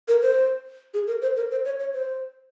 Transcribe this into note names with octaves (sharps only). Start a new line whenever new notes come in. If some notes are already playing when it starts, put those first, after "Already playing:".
A#4
C5
G#4
A#4
C5
A#4
C5
C#5
C#5
C5